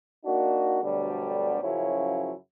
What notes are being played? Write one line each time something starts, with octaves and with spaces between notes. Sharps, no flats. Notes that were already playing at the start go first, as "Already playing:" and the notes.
A#3 D4 D#4 F#4
D2 B2 D3 F#3 G3
F#2 C#3 F3 F#3 C#4 E4